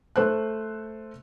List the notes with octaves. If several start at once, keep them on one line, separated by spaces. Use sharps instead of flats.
A3 C5 F#6